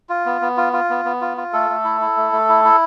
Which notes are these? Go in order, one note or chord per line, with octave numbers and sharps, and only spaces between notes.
F4
B3
B3
F4
F4
B3
B3
F4
F4
A3 A4
A3
E4
E4
A3
A3
E4
E4